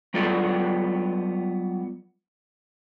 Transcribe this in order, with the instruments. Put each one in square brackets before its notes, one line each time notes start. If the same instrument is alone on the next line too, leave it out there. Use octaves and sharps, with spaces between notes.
[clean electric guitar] F#3 G3 B3 F4 A4 D5